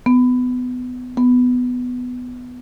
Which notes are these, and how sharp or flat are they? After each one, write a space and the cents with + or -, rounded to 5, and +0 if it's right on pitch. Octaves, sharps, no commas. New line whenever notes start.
B3 +20
B3 +10